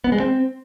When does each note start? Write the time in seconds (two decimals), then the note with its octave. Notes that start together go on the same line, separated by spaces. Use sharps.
0.04 B3
0.12 G#3
0.20 C4